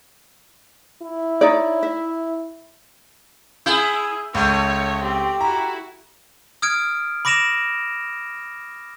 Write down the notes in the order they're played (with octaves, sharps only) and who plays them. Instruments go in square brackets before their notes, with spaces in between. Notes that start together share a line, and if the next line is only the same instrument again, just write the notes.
[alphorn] E4
[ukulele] D#4 C#5 D5
E5
[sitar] E4 [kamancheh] G#4 [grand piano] G6
[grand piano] C#2 [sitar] A3 [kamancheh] C#5
[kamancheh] C4 [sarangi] G4
[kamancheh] E4 F#4 [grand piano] A#5
[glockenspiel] D#6 F6 G#6 D7
B5 D6 A#6 D7 E7 F7